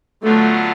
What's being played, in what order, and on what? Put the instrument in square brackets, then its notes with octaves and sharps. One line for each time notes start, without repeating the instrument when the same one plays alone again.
[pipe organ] D3 F#3 B3 D4 F4 [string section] A3